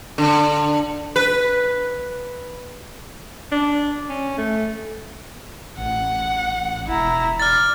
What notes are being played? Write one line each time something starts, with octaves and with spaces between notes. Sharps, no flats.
D3
B4
D4
C#4
A3
A1 F#5
E1 E4 A#5
D5 F6 A6